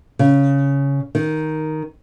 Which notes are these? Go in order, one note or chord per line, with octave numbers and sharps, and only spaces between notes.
C#3
D#3